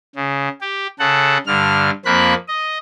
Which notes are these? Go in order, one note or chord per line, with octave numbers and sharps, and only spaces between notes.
C#3
G4
C#3 A4 F#5
G2 D3 F6
F2 A#3 C4 B5 F#6
D#5